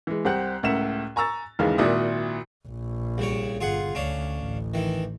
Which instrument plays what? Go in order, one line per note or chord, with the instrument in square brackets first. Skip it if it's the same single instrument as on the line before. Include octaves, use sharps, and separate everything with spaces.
[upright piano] E3 G#3
C2 C4 G4 F#5 F#6
C#2 A2 A#4 E5 F#5 E7
G#5 A#5 C#6 E6 A6
A1 D#2 C#3 E3 G#3 F5
G#1 A#2 E4 F#4 D5 D#6
[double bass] A#1
[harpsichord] C2 C#3 C#5
[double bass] G1 [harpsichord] F4 G#4 F#5
[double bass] D2 [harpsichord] C#4 D4 F5
[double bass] A1
[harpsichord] D#3 E3